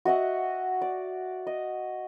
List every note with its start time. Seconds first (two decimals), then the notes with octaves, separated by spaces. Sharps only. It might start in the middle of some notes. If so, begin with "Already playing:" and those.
0.05 F#4 D#5 E5 F#5
0.81 D5
1.47 D#5